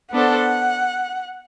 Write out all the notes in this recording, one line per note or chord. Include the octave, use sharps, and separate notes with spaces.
B3 D4 A4 C5 F#5